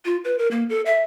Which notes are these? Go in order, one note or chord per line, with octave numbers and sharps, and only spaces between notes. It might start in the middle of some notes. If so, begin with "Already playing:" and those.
F4
B4
A#4
A#3
A4
E5